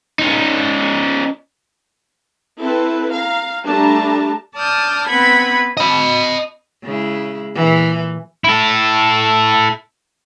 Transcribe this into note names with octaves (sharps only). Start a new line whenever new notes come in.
C#4 D#4
C4 E4 A4 B4
F5 A#5
G3 A3 D4 A5 A#5
D5 A5 D#6 F6 G6
B3 C4 B4 F#5 B5 G#6
D#5 B5
C#3 G#3 E4
A#2 E3
E4 A4